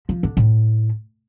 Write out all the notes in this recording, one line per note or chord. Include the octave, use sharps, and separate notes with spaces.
F3
D3
A2